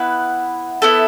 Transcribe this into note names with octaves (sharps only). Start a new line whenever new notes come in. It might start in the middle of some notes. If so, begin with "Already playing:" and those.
Already playing: B3 E4 B4 F#5
B3 E4 A4